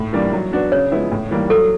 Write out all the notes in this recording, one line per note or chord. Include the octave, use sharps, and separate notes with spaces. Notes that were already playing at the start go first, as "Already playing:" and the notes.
Already playing: A2
E3 G3 A#3 D4
F#3
B3 D4 F#4
C#3 C#5
F3 G#3 B3 E4
A2
E3 G3 A#3
F#3 A4